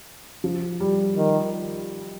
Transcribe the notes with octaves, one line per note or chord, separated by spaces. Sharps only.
F3
G3
D#3